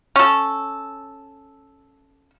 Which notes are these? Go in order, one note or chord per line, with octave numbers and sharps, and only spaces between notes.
C#4 A4